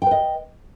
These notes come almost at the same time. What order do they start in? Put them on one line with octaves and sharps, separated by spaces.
G5 B4 D#5